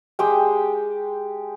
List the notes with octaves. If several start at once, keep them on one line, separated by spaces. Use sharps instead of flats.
G#3 G4 G5